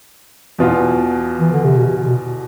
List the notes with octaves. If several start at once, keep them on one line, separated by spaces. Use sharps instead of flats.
E2 B2 B3 F4
E3
D3
C3
B2
B2